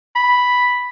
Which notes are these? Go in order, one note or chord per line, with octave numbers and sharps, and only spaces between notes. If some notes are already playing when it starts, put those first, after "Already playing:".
B5